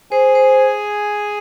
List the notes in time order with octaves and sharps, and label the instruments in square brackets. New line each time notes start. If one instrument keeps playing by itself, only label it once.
[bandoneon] G#4 G#5 [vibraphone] C5
[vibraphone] C5